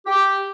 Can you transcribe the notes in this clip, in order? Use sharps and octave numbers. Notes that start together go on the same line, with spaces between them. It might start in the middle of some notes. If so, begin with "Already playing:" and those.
G4